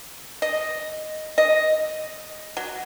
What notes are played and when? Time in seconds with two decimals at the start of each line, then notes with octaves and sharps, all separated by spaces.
0.42 D#5
1.38 D#5
2.57 F#3